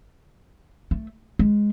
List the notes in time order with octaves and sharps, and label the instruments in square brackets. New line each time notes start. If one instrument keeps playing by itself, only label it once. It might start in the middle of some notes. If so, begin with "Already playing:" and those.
[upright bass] A3
G#3